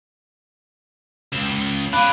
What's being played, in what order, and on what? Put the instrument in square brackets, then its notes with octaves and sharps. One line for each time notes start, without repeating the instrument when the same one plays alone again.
[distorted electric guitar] C#2 [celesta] E7
[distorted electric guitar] D4 G#4 [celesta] F5 B5 F#6